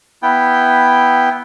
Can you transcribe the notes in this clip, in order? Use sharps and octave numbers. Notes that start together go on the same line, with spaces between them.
B3 E4 G5